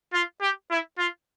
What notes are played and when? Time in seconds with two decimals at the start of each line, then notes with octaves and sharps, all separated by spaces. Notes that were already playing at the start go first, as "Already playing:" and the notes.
0.13 F4
0.41 G4
0.71 E4
0.98 F4